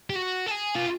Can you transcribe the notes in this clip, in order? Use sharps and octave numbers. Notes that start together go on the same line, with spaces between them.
G4
F#4
A4
G#4
F4